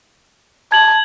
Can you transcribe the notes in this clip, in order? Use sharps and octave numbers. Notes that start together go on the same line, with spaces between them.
A5 G#6 F#7